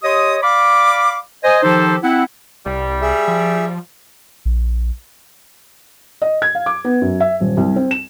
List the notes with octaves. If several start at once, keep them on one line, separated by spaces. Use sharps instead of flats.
G4 C#5 D#5 C6 D#6
D5 F5 B5 D6
C5 D#5 G#5
D#3 F3 D#4 G4 A4 C5
C4 E4 F#5
C2 G3
G#4 E5
F3
A#1
D#5
G#6
F5
D6
B3
F#2
E5
D#1
C2
C4
E7